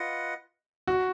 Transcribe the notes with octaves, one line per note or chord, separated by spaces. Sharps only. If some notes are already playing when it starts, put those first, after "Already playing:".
Already playing: F4 B4 D#5 F#5
F#4